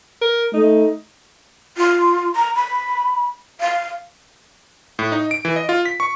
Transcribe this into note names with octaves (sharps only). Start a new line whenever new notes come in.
A#4
A3 D#4
F4
A#5
B5
F5
A2
D#4
D7
E3
D#5
F4
B6
C#6